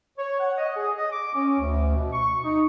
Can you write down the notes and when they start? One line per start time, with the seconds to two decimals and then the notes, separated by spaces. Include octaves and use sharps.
0.18 C#5
0.40 F#5
0.58 D#5
0.76 G#4
0.96 D#5
1.11 D6
1.35 C#4
1.59 D2
1.95 B2
2.12 C#6
2.44 D#4